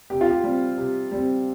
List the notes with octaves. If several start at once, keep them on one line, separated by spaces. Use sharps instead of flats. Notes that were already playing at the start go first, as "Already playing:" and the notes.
C3 G4
F4
G4
G3 C4
C3
G3 C4